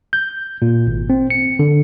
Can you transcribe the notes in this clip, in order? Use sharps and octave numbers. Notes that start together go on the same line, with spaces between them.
G6
A#2
G#1
C4
C#7
D3